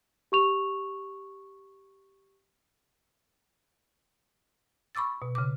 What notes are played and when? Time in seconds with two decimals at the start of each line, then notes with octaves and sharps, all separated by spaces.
0.32 G4 C#6 F7
4.95 B5 C#6 D6 E6 A6
5.22 B2
5.35 C#3 D6